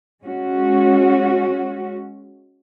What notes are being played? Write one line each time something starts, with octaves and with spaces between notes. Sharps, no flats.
G#3 C#4 F#4